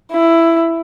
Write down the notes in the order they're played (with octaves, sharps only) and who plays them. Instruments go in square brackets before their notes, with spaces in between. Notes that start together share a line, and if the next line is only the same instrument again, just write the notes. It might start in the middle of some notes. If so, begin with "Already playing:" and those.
[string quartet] E4